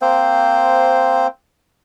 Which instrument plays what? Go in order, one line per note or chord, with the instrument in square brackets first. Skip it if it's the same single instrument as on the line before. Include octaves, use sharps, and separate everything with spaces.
[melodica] A#3 C4 C5